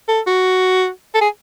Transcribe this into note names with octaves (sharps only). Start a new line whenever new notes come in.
A4
F#4
A4
G#4